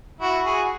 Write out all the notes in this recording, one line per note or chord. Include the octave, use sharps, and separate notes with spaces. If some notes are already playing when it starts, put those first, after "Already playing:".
E4 F#4
F#4 G#4